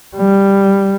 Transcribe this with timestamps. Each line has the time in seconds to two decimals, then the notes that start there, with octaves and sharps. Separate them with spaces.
0.17 G3